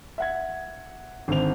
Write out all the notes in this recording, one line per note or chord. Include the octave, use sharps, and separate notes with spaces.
E5 F#5 G#6
G#1 D3 C5 F7